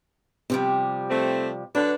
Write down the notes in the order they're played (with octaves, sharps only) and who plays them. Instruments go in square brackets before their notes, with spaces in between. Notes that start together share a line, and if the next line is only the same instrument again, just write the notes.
[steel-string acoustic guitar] C3 F3 G3
[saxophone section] A3 C4
[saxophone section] D3 F#3 D4 [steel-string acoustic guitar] B4